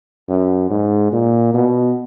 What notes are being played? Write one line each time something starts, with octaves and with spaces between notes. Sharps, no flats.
F#2
G#2
A#2
B2